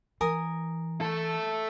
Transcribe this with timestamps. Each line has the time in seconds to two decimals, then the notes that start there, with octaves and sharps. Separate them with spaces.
0.21 E3 A#4 G#5 D#6
1.01 A3 A4